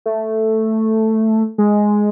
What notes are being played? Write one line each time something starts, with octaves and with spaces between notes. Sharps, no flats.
A3
G#3